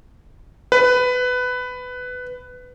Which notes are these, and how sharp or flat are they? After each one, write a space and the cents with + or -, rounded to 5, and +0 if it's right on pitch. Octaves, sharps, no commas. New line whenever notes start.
B4 +15